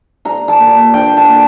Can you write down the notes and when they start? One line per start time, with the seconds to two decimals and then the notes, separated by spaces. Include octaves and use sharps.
0.25 G3 A#5
0.48 A5
0.59 A#2
0.94 D4 G5
1.17 A5
1.28 A#2